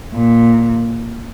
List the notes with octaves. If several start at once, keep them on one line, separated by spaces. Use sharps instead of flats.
A#2